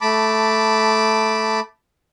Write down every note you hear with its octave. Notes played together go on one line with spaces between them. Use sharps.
A3 A5 B5 D6